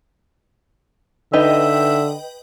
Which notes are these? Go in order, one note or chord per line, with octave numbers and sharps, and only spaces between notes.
D3 D#4 B4 D#5 E5 G5